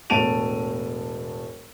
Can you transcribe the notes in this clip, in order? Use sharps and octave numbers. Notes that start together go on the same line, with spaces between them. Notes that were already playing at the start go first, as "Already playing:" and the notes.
E1 A2 A5 D7 D#7 F7